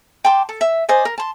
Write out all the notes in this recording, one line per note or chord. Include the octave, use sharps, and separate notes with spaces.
G5 A5 C6 D6
A4
E5
C5 D5 D#5 G#5
A#4
A5 C6